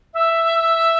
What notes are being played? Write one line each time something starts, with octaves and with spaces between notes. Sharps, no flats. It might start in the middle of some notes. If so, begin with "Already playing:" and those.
E5